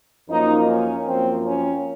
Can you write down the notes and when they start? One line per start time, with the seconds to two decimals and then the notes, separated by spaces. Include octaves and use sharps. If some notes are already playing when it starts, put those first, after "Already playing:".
0.29 F#2 F3 A#3 D#4
0.69 C#4
1.08 F#2 F3 A#3 C4
1.47 C#4